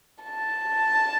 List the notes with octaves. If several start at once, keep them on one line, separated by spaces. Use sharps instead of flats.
A5